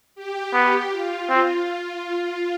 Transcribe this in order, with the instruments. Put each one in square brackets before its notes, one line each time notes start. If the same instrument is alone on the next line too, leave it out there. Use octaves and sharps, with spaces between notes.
[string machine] G4
[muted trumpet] B3
[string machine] F4
[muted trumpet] C4